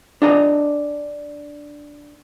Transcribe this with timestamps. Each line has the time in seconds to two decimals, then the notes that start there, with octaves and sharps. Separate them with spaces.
0.22 D4 G#4 D#5 A#5